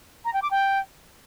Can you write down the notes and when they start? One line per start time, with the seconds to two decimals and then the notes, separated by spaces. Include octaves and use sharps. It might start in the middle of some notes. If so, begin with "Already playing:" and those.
0.25 A#5
0.34 G5
0.42 D6
0.51 G5